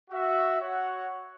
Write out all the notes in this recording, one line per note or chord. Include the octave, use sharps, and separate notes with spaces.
F#4 E5
F#4 C#5 F#5